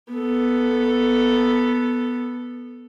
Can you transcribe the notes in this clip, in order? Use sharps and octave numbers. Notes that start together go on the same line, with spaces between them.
B3 A4